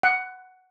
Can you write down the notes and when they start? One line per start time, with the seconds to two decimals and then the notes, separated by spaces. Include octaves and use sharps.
0.03 F#5